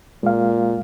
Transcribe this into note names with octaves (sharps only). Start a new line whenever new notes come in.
A#2 G#3 F5